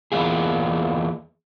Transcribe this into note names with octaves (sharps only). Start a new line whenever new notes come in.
E2 G#2 A#3 F4 G#4